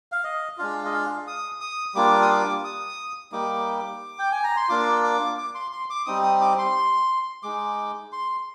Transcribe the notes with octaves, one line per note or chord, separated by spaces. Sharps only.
F5
D#5
G#3 D4 F4 F5
D#5
F5
D#6
D#6
G3 A#3 D4 F4 D6
D#6
D6
D#6
G3 A#3 D#4 D6
G5
G#5
A#5
C6
A#3 D4 F4 D6
D6
D6
C6
C6
D6
G3 C4 D#4 D#6
D#6
D6
C6
G#3 D#4 D6
C6